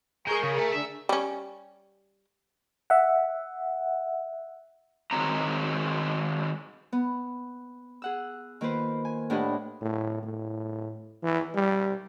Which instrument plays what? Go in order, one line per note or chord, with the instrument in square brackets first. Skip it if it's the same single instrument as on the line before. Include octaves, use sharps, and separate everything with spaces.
[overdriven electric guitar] G#3 [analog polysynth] G#4 C#6 G6 [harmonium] A#4
[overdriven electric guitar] C#3 [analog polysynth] G#4
[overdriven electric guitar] A3 A4 [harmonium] A#4
[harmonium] D3 [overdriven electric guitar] E5
[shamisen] G3 C#4
[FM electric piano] E5 F#5
[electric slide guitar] D#3 F#3 G#3 C4 A#5
[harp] B3
G#4 F#5 E6
D#3 A#3 F4 B4 C5
G#5
A2 D4 G4 D#5 F#5
[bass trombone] A2
A2
E3
G3